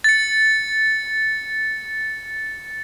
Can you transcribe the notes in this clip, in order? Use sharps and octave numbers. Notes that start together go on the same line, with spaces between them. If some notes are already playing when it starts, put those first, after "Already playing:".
A6 C#7